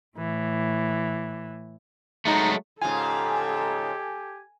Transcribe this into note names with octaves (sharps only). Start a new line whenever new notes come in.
A2 E3
F#3 G#3 A3 D#4
G#2 C#3 F4 G4 A4 G#5